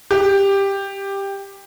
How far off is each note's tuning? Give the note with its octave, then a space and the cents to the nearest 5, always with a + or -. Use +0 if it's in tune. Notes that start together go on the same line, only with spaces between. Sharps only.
G4 +10